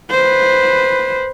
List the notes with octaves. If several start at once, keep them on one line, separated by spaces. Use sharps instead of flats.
B4 C5